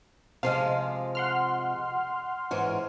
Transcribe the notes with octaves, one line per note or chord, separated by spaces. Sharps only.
C3 F3 G#3 F5
F#5 C6 F6
G#2 E3 C#5